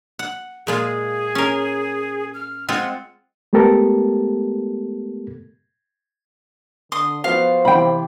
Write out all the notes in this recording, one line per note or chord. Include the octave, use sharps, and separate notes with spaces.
F#5
A#2 G#3 F4 G#4
C#4 A#4
F6
G#3 C4 F4 F#5
G#3 A3 B3 G4 A4 A#4
D3 C6 D#6
F3 B3 F#4 C5 F5
C3 E3 G5 B5